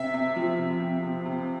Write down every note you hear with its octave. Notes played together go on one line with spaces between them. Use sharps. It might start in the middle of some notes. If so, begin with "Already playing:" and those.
Already playing: C3 E5
C3
F3
C3
C3
C3
C3